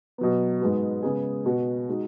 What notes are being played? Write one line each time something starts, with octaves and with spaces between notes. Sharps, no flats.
B2 F#3 B3
G#2 G#3 B3 F#4
C#3 G#3 B3 G#4
B2 B3 F#4
G#3 D#4 F#4